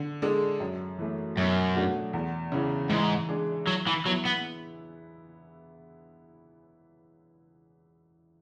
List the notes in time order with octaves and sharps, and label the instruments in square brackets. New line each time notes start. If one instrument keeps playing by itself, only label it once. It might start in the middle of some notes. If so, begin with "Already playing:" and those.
Already playing: [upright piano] D3
G#3 D4 A4
F#2
E3 A3
[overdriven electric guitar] F#2 [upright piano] B2
[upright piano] F#3 A3 D4 F#4
E2
C#3 E3
[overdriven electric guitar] G#2 [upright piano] E3
[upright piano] G#3 D4 G#4
[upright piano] E3 [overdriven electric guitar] F#3
[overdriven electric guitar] E3
[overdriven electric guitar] F#3 [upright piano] B3
[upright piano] E4
[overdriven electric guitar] B3